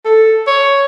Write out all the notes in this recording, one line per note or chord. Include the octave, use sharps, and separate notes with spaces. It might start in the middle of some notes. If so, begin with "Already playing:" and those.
A4
C#5